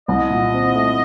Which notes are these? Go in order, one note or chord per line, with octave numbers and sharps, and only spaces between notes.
C2 D#5
A#2
C4
A3